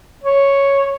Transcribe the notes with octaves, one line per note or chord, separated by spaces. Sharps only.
C#5